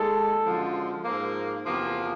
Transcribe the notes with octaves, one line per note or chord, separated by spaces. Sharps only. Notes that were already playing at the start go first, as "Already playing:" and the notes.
Already playing: D#2 D#3 G#3 A4
F#2 D3 F3 G#3
G#2 F3 A#3
E2 C3 F3 A#3